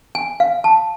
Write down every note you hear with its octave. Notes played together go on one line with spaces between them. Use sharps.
G#5
F5
A5